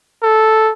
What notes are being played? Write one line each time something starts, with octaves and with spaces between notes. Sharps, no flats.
A4